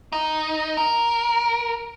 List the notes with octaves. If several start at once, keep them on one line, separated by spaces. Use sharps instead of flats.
D#4
A#4